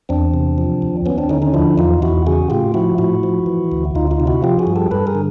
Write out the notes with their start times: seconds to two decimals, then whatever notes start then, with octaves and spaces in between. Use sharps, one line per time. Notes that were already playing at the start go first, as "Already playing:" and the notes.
0.09 E2 C4 D4
0.34 C3
0.58 F3
0.82 D#2
1.06 D#2 B3 C#4
1.18 C4 D4
1.29 D3 C#4 D#4
1.42 C#4 D#4
1.54 F3 D4 E4
1.78 E2 D#4 F4
2.02 E2 E4 F#4
2.27 C#3 F#4 G#4
2.50 A2 F4 G4
2.74 F3 E4 F#4
2.98 A2 E4 F#4
3.23 F3
3.46 E3
3.72 D2
3.95 D2 D#4 F4
4.11 D#4 F4
4.20 C3
4.27 E4 F#4
4.43 F3 F4 G4
4.59 F#4 G#4
4.67 G2
4.76 G4 A4
4.91 G2 A4 B4
5.07 G#4 A#4
5.15 D3